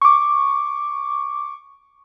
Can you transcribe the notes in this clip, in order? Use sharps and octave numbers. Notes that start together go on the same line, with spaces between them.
C#6 D6